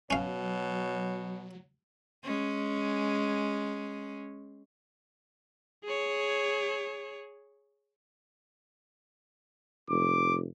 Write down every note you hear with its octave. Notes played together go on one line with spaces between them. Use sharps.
B2 F#3 C#4 C#5 F5
G#3 C#4
G#4 C#5
F1 D6